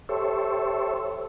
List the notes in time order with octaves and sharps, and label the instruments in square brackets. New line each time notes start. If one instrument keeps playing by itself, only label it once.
[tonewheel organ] G4 A4 C5 C#5 E5